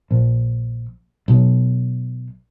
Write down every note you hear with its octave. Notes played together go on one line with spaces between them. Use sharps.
A#1
B1